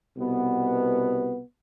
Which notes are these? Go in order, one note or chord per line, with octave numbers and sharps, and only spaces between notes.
C2 B2 B3